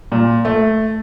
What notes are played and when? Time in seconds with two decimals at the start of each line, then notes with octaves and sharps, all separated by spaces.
0.12 A#2
0.45 A3